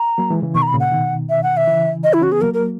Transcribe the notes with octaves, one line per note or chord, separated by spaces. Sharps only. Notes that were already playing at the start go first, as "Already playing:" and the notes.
Already playing: A#5
F#3 A#3
E3 G#3
C#3 E3
B2 D#3 C#6
A#5
B5
A#2 C#3
F#5
B2 D#3
E5
F#5
E5
C#3 E3
D#5
E4
C#4 F#4
B3 G#4
F#3 A#3 A#4
A#4